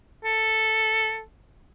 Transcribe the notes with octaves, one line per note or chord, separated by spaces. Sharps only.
A4